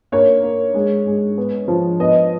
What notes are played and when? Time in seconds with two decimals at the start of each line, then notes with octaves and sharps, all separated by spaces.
0.12 A#3 C#5
0.43 A#3
0.74 G#3
1.06 G#3
1.38 B3
1.68 F3
2.00 B3 D#5